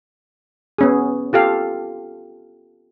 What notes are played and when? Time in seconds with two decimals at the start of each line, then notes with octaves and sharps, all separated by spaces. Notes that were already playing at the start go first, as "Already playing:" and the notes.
0.78 B3 C#4 G#4
1.33 F4 G4 A4 F5